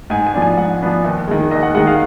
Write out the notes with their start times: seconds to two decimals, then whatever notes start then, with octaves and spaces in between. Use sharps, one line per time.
0.10 G#2 G#5
0.27 G#5
0.34 F3 B3 D4
0.42 G#5
0.57 G#2 F#5
0.82 F3 B3 D4
1.04 D#2
1.28 D#3 G#3
1.51 D#2 D#5
1.63 F#5
1.75 D#3 G#3 F#5
1.87 F5